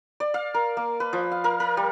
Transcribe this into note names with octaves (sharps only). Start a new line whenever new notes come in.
D5
F5
A#4
A#3
B4
F3
F5
A#4
A#4
G3